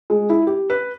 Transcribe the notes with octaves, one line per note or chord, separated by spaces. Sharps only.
G#3
E4
G4
B4